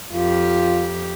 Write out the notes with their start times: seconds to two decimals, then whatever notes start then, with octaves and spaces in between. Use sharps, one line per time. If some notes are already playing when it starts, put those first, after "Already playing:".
0.13 F2 F4 G4